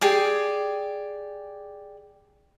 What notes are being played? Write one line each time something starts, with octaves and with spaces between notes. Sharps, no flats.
G4 G#4 D5